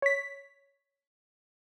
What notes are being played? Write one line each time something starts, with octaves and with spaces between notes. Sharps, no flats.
C#5 B6